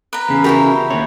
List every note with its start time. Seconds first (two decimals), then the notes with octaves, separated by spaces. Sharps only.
0.13 B4 A#5
0.29 E2 C#3
0.44 E4 F#4 G4 A#4 G5 A#5
0.90 D#2 C4 C#5